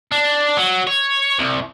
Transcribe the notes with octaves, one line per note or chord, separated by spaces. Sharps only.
D4
F#3
C#5
C2